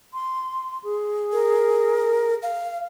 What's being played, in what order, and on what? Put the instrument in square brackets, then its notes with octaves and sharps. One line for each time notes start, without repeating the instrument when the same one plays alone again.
[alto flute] C6
G#4
[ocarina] A#4
F5